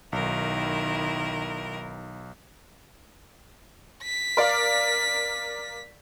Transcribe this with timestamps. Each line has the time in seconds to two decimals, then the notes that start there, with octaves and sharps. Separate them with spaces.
0.13 B1 D#3 E4 A#4
4.03 B6
4.37 A#4 D5 F5